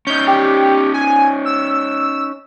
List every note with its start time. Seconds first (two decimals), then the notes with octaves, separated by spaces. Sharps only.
0.07 C#4 D#4 G6
0.28 G4
0.94 G#5
1.45 E6